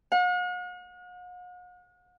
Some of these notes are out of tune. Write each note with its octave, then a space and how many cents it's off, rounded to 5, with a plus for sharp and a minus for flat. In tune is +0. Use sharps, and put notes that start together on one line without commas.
F#5 -45